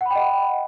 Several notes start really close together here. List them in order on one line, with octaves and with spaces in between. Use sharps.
F#5 B5 G5 D#5